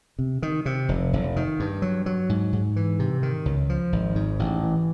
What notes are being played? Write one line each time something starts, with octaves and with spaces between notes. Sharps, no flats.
C3
D#3
C3
F1
F1
D#3
G2
F#3
F#3
G#2
G#2
E3
C3
D#3
C#2
F3
G#1
G#2
A1
E3